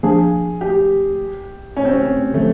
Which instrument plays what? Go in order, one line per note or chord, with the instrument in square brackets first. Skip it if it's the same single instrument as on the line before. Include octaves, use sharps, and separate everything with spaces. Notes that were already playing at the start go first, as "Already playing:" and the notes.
[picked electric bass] F3 A#3 D4 [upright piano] G#4
[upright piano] G4
C#4
C4
C#4
[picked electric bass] C#3 F3 [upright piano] A3